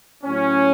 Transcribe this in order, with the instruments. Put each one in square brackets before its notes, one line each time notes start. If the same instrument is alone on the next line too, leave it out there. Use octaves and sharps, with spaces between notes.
[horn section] A2 F#3 C#4